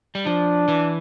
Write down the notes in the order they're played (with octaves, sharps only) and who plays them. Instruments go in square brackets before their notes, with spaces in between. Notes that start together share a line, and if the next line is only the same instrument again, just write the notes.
[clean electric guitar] G3
[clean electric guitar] F3 [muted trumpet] D4
[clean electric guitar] E3